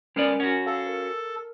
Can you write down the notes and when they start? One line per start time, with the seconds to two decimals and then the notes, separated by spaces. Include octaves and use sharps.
0.16 G#3 B3 C#4 A#4 D5 F6
0.40 C#4 F#4 F#5
0.66 A4 F5
0.86 A#4